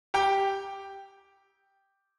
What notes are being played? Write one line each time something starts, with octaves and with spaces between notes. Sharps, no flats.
G4 G5